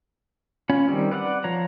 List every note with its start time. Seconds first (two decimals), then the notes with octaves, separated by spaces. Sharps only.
0.70 C#4 F4 C#5 B5
0.88 D#3 G3 C4
1.12 B4 D5 F5 F#5
1.44 F3 C#5 A#5